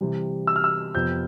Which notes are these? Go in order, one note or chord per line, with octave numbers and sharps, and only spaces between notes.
C3 E3 G3
E6
F6
E6
F2 C3 F3 B3 G6